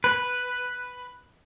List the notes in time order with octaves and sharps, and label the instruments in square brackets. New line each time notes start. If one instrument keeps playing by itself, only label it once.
[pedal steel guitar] B4